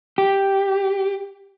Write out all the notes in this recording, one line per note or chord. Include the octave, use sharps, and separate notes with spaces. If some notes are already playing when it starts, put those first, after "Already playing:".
G4